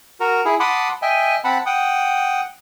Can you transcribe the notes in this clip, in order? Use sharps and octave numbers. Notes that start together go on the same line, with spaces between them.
F#4 A#4
E4 G#4
F#5 A5 B5 C6 D6 D#6
D#5 E5 G5 G#5
C4 F#5 A5 B5
F#5 G5 D#6